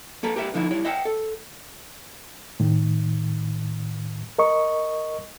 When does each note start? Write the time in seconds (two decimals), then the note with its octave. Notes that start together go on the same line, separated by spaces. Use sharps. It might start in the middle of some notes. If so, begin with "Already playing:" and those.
0.23 A#3 A4 B4 A#5
0.36 G4 A#4 B4 E5
0.54 D3 F3 D#4 E4
0.71 G3 E4 C#5
0.85 D#5 E5 F#5 G5
1.05 A4
2.60 A2 D#3
4.39 A#4 D#5 C#6